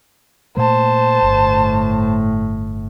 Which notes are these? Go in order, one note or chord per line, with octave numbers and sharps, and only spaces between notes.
A#2 A3 A#3 C5 A5
G1 A2